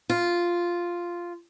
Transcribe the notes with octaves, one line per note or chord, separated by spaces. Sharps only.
F4